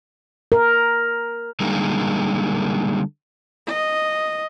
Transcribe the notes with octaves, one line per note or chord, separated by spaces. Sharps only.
A#4
D3 G3 G#3 A#3 D#4 A#4
D#5